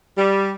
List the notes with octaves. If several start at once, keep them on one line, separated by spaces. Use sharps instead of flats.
G3